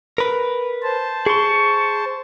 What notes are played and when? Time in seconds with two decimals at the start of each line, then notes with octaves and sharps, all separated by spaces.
0.18 A#4 B4
0.83 C5 A5
1.26 G#4 C6 C#6